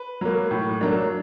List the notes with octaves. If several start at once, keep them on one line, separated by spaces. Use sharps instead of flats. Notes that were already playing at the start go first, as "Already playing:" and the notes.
Already playing: B4
F#3 A#3
A2
F#3 A#3 D4